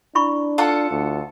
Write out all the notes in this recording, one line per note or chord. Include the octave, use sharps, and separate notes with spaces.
D4 E4 B5 C#6
F4 A4 F#5
D2